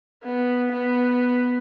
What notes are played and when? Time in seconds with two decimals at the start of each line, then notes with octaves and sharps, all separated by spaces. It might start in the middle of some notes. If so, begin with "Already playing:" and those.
0.24 B3
0.73 B3